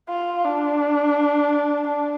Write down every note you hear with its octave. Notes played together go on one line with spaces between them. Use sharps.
F4
D4
D4